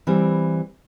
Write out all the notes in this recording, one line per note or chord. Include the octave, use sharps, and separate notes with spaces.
E3 G3 C4